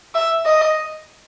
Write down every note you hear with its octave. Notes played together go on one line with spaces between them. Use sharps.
E5
D#5